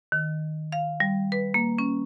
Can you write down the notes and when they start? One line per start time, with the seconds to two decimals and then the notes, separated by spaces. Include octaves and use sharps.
0.12 D#3
0.72 F5
1.00 G3
1.32 B4
1.54 A#3
1.78 C#4